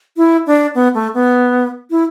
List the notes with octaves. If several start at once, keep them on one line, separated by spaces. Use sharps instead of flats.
E4
D4
B3
A3
B3
E4